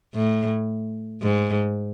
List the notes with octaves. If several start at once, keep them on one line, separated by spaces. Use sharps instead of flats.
A2
G#2